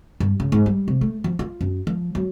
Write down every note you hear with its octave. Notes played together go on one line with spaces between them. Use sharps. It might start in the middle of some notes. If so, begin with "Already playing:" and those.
G2
C#3
G#2
G3
C3
A3
F3
F4
F#2
F3
F#3